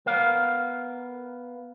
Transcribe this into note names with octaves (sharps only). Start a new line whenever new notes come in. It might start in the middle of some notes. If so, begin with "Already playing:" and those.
B3 A#4 F5